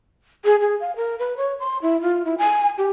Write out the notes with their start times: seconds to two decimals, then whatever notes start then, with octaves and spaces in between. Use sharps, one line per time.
0.45 G#4
0.61 G#4
0.80 F5
0.96 A#4
1.19 B4
1.37 C#5
1.60 C6
1.82 E4
2.02 F4
2.25 E4
2.38 G#5
2.78 G4